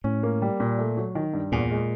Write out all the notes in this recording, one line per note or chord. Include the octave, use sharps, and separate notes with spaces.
A2 C#4
A#3
G3
A#2
A3
F#3
D#3
G2
E2 A#2
G#3